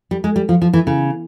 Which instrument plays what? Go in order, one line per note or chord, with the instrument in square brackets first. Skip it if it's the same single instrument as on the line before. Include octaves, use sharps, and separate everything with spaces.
[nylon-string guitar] G3
G#3
G3
F3
F3
E3
C#3